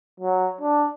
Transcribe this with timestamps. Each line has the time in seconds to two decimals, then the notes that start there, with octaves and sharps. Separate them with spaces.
0.20 F#3
0.61 D4